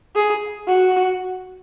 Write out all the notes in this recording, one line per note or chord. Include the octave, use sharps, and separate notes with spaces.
G#4
F#4